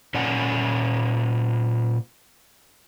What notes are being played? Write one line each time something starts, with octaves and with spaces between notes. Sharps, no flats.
A#2 C#4 D5 F#5 G#5